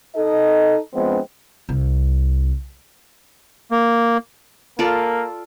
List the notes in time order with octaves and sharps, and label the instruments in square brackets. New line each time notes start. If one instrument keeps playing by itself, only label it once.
[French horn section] D#4 A4 D#5
F3 G#3 B3 C4 D4
[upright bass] C2
[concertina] A#3
[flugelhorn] A#3 [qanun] F4 A4 D5